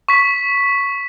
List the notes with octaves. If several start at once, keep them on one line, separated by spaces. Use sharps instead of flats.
C#6 B6